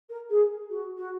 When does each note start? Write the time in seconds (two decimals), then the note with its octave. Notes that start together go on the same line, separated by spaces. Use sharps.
0.09 A#4
0.30 G#4
0.70 F#4
0.97 F#4